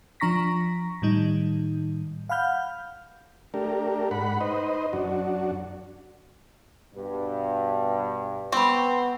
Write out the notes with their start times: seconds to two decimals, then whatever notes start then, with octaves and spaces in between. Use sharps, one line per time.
0.20 F3 D4 A#5 C#6 A#6 B6
1.02 A2 D#3 G3 D#4
2.29 F5 F#5 B5 F6 G6
3.54 A3 D4 G4 A#4
4.11 G#2 F#5 B5
4.41 D#4 B4 C5 D#5
4.93 F#2 D4 F#4
6.94 G2 B2
8.52 B3 C4 B5 C#6